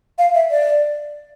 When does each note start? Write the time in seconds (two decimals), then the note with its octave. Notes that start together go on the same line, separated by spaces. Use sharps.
0.18 F5
0.34 E5
0.51 D5